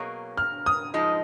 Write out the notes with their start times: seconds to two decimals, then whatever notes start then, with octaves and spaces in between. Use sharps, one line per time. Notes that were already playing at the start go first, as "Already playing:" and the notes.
Already playing: B2 F#3 A#3 C#4 G#4
0.38 F6
0.66 D#6
0.94 F3 G#3 D#4